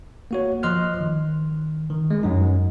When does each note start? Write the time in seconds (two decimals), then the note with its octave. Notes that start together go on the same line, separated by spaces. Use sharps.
0.31 A#3 F#4 C#5
0.63 F3 D#5 C6 F6 F#6
1.01 D#3
1.90 D#3
2.10 G#3
2.23 F#2 F#3 D#4